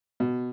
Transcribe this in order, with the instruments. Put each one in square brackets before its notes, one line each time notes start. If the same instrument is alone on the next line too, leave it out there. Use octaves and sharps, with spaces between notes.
[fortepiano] B2